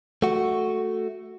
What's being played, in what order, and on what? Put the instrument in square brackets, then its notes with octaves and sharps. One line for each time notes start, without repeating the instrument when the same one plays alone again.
[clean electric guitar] A3 F#4